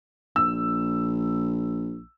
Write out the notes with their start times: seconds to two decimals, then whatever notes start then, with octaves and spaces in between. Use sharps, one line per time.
0.36 A#1 E6